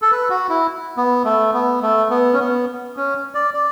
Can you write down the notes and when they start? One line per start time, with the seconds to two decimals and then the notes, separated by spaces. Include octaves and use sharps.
0.02 A4
0.11 B4
0.30 F#4
0.50 E4
0.97 B3
1.25 A3
1.54 B3
1.82 A3
2.11 B3
2.33 C#4
2.40 B3
2.97 C#4
3.35 D5
3.54 D5